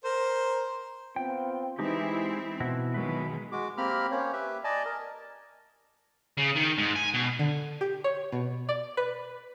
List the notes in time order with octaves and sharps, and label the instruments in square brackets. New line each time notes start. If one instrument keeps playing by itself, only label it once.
[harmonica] A#4 C5
[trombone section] B3 C4 F4 [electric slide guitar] G5
[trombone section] E3 [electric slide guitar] G#3 D#4 G4 [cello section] C4 E4 E5
[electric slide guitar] B2 E4 F#4 [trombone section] E3
[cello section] B2 D#3 G#3 [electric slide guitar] F#3 B4
[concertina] G#3 F#4 D6
A#3 C4 G4 A#4 B5 F6
A#3 C#4 C5 C#5
G4 B4 E5
D5 D#5 G#5 A5
A#4
[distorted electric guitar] C#3
D#3
G#2
G#5
B2
[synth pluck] D3
G4
C#5
B2
D5
B4